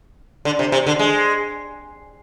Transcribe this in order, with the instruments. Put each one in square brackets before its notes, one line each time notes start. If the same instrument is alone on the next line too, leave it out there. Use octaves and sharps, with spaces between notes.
[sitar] D3
C3
C3
D3
G#3